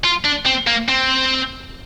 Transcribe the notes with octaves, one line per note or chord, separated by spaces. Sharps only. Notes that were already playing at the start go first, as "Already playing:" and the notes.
F4
D4
C4
A#3
C4